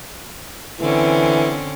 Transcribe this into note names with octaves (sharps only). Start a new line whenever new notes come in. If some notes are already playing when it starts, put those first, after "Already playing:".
D3 E3 C4 C#4